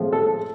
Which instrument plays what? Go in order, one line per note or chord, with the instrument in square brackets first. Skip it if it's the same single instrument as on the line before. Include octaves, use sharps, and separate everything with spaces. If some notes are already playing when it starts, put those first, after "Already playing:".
Already playing: [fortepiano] A2 F3 G#3 C4 F4
A4